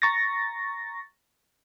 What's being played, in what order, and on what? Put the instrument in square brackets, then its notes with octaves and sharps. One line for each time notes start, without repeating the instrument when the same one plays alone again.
[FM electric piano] A#5 C#6 A6 A#6